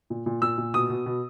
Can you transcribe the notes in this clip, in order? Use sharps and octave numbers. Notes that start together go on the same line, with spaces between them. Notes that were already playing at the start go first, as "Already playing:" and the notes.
A#2
A#2
A#2 E6
A#2
B2 D#6
B2
B2